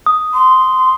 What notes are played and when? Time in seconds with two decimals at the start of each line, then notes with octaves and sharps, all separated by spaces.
0.06 D#6
0.34 C6